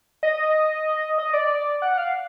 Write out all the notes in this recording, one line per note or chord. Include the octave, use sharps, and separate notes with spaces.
D#5
D#5
D5
F#5
F5